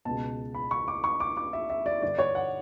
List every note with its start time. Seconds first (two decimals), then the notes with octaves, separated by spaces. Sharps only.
0.05 C#2 B2 A5
0.54 B5
0.71 C#6
0.88 D6
1.04 C#6
1.20 D6
1.37 D6
1.53 E5
1.70 E5
1.86 D5
2.02 G2 D3 D5
2.19 C#5
2.35 F#5